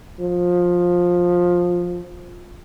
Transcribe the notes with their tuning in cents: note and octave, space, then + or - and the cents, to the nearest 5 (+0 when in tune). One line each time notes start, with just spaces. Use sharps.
F3 +15